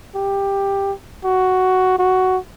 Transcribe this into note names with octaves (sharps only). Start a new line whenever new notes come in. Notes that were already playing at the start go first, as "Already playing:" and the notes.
G4
F#4
F#4